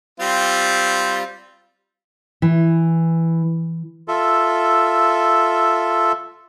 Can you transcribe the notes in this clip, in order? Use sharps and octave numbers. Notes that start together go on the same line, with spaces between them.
G3 C4 F4
E3
F4 A4 E5